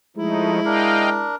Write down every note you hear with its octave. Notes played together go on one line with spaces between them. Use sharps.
F3 G#3 A3 D#4 E4
D4 A#4 D#5 F5 G5